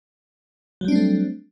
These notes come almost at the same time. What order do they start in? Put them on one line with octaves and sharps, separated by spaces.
F#3 G3 D4 C4 A3